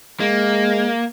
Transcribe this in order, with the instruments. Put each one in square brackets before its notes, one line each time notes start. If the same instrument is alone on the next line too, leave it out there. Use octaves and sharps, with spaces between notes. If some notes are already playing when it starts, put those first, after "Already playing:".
[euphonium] G#3 [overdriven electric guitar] A#3